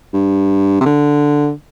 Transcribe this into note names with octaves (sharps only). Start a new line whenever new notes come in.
G2
C3
D3